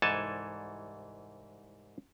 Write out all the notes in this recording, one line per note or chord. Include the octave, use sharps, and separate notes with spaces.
C2 G#2 E3 A4 G#5 A5